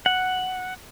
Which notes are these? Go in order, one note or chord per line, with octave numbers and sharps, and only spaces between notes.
F#5